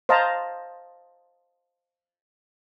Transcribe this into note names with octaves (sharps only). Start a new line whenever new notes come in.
C5 D#5 F5 A5 A#5